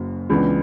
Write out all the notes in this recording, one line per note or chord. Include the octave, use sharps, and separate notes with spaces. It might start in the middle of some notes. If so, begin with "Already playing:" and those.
Already playing: F#1 F#2
C#2 C#3 E3 B3 D4